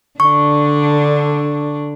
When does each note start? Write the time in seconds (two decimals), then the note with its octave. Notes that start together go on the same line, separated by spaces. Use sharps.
0.20 D3 D4 C#6